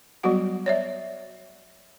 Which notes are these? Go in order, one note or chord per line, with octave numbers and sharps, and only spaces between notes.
F#3 G3 B3 F#4 F#5
C#5 D5 E5